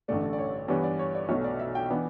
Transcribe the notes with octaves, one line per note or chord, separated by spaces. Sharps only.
A1 G2 D3 A3 D4 D5
D5
C#5
G2 E3 G3 B3 D4 C#5
D5
C#5
D5
B1 B2 A3 C#5
D5
E5
G5
E3 B3 D4